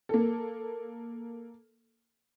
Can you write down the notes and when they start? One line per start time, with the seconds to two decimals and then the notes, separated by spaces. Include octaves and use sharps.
0.09 A#3 A4